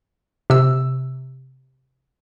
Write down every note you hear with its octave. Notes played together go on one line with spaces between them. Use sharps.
C3 E6